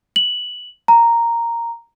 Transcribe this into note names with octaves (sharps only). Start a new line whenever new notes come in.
F#7
A#5